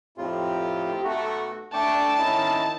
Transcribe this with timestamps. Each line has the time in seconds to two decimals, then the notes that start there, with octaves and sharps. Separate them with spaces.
0.17 F2 A2 C4 D#4 F4 G4
1.04 B1 A3 F#4
1.73 A3 D4 G5 A5 C#6 D6
2.18 D#3 C#4 D#4 E4